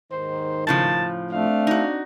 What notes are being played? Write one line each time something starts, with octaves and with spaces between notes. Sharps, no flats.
D#2 G#2 D#3 C5
A2 C#3 F3 A5
A3 C4 D4 F5
D#4 F#4